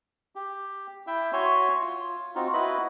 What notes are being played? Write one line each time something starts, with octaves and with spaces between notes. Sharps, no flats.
G4
E4 E5 G5
F#4 C#5 E5 G#5 C6
F4
C4 D#4 F4 F#4
E4 F#4 B4 D#5 B5